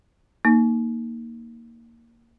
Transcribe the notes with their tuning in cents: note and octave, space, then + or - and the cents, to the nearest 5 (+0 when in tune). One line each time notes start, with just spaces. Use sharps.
A#3 -5 D#4 +0